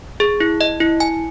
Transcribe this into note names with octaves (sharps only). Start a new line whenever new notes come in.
G#4
E4
D#5
E4
G#5